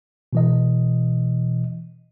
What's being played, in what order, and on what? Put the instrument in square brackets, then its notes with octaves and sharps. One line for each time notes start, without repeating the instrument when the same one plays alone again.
[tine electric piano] B2 E3 D#5